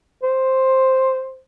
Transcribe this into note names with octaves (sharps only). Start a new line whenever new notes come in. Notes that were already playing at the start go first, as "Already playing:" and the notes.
C5